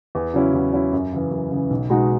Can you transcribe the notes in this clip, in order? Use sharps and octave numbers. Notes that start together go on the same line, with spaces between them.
E2
C#3 F#3 C#4 E4
E2
C#3 F#3 C#4 E4
F#2
C#3 E3
F#2
C#3 E3
B1
B2 G#3 D#4 F#4